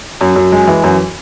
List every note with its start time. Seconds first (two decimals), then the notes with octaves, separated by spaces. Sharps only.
0.21 F#2
0.36 F#2
0.52 G#3
0.67 E3
0.83 F#2